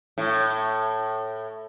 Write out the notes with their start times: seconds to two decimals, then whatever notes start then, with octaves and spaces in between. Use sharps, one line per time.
0.18 A2